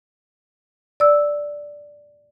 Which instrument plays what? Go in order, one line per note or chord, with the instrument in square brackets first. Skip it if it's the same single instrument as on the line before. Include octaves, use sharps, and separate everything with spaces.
[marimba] D5 E6